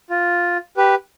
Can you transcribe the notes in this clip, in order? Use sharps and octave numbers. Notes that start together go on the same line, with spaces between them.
F4
G4 B4